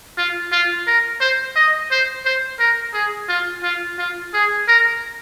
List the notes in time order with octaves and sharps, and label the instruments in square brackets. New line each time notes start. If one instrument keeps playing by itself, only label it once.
[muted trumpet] F4
F4
A#4
C5
D#5
C5
C5
A#4
G#4
F4
F4
F4
G#4
A#4